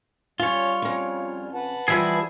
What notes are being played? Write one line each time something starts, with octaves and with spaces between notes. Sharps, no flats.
G3 C#4 F4 C#5
F2 C#3
B4 F#5 A5
E3 F3 G3 G#4 E5 B5